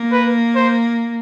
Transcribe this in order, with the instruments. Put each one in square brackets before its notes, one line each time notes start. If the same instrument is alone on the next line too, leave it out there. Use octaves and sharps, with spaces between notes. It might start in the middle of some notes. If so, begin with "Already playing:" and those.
Already playing: [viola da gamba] A#3
[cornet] B4
C5